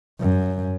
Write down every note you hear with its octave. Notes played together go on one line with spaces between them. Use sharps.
F#2